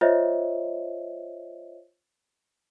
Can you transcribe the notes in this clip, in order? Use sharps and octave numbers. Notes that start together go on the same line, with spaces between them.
F4 C5 C#5 D#5 E5